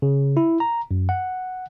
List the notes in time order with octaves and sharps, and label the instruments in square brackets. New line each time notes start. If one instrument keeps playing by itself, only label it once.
[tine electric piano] C#3
E4
A#5
F#2
F#5